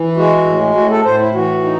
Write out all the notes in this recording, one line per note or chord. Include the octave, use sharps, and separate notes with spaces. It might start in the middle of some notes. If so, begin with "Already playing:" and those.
Already playing: E3
G#3 F#4
A2
A2 F#4
A4
A2 C5
E4
E3 F#4
D#4